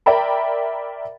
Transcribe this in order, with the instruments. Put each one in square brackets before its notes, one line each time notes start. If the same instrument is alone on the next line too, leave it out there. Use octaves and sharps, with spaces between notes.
[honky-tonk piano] A#4 D5 E5 G5 A#5 B5